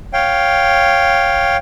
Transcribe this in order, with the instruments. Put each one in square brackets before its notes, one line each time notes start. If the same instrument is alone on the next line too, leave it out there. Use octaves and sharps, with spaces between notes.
[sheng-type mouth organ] C#5 F5 G5